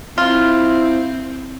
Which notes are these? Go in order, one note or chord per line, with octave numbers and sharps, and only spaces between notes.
C4 E4 F4